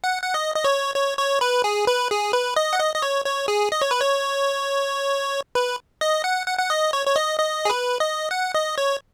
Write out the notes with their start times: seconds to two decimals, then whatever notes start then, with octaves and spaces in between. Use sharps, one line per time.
0.04 F#5
0.23 F#5
0.34 D#5
0.56 D#5
0.64 C#5
0.95 C#5
1.18 C#5
1.41 B4
1.64 G#4
1.87 B4
2.11 G#4
2.33 B4
2.56 D#5
2.73 F#5
2.79 D#5
2.95 D#5
3.02 C#5
3.25 C#5
3.48 G#4
3.72 D#5
3.82 C#5
3.91 B4
4.01 C#5
5.55 B4
6.01 D#5
6.24 F#5
6.47 F#5
6.59 F#5
6.70 D#5
6.93 C#5
7.07 C#5
7.16 D#5
7.40 D#5
7.65 G#4
7.70 B4
8.00 D#5
8.31 F#5
8.54 D#5
8.78 C#5